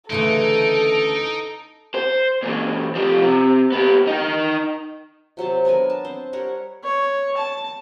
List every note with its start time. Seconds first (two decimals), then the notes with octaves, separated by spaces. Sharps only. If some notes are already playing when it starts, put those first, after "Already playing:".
0.10 D2 C#3 E3 D#4 A4 D7
1.94 C5
2.43 A#2 E3
2.95 F3 G4
3.22 C3
3.72 B3 G4
4.07 D#4 G5
5.37 C3 F#3 C4 A5
5.65 B3 D4 A#4 G#5
5.90 A5
6.05 C4 C5
6.33 G3 A#4 C#5 F#5
6.84 C#5
7.37 A5